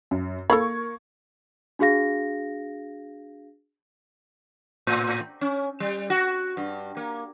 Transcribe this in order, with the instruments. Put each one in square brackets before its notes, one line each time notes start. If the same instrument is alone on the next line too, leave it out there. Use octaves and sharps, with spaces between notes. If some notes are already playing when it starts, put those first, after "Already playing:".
[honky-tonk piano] F#2
[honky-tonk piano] A#3 C#6 G#6 [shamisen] A4 F5 B5
[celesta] D4 F#4 G#4 F5 A#6
[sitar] A2
C#4
G3
F#4
G2
A#3